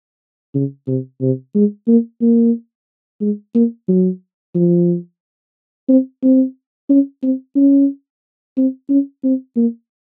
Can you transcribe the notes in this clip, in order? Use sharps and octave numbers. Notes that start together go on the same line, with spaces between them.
C#3
C3
C3
G#3
A#3
A#3
G#3
A#3
F#3
F3
C4
C4
C#4
C4
C#4
C4
C#4
C4
A#3